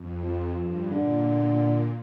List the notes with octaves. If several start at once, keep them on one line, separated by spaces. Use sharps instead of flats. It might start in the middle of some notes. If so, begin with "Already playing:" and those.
Already playing: F2
F3
G2
A#2 D3